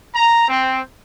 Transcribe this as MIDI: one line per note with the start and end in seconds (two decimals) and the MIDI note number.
0.15 0.45 82
0.48 0.82 60